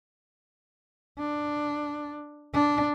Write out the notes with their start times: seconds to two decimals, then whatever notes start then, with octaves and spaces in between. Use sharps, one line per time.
1.19 D4
2.54 D4